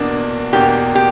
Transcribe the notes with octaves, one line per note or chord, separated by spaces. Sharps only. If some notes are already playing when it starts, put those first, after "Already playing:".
Already playing: E2 B2 A#3 D4
E2 B2 A#3 D4 G4
G4